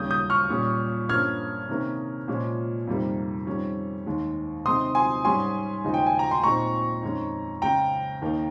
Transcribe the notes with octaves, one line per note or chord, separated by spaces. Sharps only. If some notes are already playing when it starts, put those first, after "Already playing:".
Already playing: D#2 C#3 G3 A#3 C#4 D#6 G6
D#6 G6
C#6 F6
A#2 G3 C#4
G2 F3 A#3 C#4 F6 G#6
C3 D#3 A#3 C#4
A#2 F3 G#3 C#4
F2 C3 D#3 G3 A#3
F2 D#3 G3 C#4
D#2 D#3 G#3
C3 D#3 G#3 C4 D#4 C6 D#6
G#5 C6
G#2 G3 C#4 G#5 C6
D#2 C#3 F3 G#3 D#4
G5
G#5
A#5
C6
A#2 G#3 C4 D#4 A#5 C#6
F2 D#3 G#3 C#4
C#2 C#3 G#3 G5 A#5
D#2 D#3 A#3 D#4